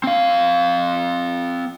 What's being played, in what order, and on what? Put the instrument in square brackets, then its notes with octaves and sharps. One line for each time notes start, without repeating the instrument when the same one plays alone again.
[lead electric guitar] C4 F5